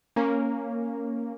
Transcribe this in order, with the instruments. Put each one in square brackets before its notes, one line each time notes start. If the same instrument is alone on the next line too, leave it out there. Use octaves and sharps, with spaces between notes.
[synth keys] A#3 C#4 A#4